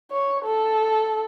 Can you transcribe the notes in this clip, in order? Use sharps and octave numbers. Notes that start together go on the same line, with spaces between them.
C#5
A4